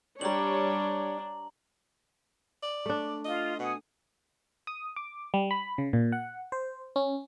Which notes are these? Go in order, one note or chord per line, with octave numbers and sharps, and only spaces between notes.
G3 D4 C#5 A#5 F#7
D5
A3 D4
F4 D#5
B2 F#5 G#5 D#6
D#6
D6
G3
B5
C#3
A#2
F#5
C5
C#4